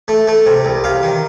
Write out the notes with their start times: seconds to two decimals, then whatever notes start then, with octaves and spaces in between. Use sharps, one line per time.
0.08 A3
0.27 A3
0.46 C3
0.65 C2
0.84 C3 F5
1.03 D#3